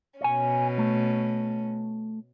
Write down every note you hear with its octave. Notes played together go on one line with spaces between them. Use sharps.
B2 C#4 C#5 G#5
A3